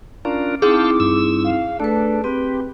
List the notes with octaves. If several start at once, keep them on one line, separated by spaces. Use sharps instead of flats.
C#4 D4 F4 A#4
C4 D#4 E4 G#4 F5 G5 A5 D6
G2 E6
F5
A3 D4 A4 B4
C4 G4 B4